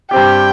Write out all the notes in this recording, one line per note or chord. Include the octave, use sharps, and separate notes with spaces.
G2 G3 C4 G4 G5